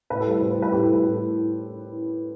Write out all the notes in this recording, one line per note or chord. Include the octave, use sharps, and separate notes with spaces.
A2 B4
A4
G3 B4
A2 C5
C5
G3
B4
A2 G4
A4
G3
B4
A2 A4